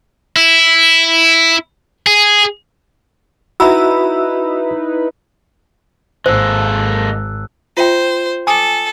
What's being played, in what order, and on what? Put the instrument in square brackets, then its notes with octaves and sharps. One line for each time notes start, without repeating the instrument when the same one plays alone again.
[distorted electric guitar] E4
G#4
[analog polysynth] D#4 E4 B4 [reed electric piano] F#4 E5 [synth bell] A#5 B5 E6
[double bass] G#1 [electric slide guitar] G#3 A#3 A4 [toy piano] C5 [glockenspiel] E6 F#6
[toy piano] F4 E5 G5 [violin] C5
[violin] A4 [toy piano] G#5 D6 D#6